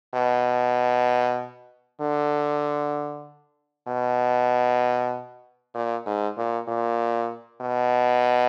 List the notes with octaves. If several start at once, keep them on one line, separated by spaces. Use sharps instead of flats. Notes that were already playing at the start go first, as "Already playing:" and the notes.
B2
D3
B2
A#2
G#2
A#2
A#2
B2